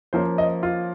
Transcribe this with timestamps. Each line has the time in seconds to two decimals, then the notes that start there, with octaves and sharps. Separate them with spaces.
0.13 F3 A#3 C#4 C5
0.38 D#5
0.63 F4